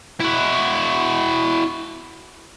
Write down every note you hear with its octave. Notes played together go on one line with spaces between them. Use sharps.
E4 F#4